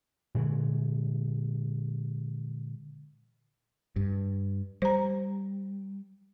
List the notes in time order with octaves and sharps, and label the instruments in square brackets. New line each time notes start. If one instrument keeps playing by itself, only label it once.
[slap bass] A#2 D3 E3 G#3
[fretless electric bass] G2
[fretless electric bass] G3 [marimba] C5 A#5